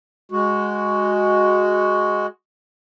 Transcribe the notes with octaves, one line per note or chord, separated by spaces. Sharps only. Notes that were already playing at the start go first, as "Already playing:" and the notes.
G#3 F#4